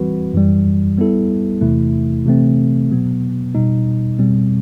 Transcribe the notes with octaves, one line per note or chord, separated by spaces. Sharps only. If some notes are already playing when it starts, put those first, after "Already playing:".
Already playing: E3 G3 C4 F#4 B4
F#2 E3 G3
G3 B3 E4 A4
E2 C3 E3 A3 E4
C3 E3 A3 C4
B2 F#3 B3
B2 G3 D#4
B2 G3 C4